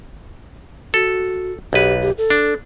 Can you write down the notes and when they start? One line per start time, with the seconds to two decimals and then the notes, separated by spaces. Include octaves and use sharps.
0.94 F#4 A4
1.73 B1 G4 B4
2.02 G4
2.18 A4
2.30 D4